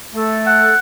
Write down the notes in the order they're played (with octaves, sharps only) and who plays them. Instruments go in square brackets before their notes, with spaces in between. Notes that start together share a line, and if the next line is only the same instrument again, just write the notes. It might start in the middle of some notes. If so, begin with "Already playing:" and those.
[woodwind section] A3 A4
[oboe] F#5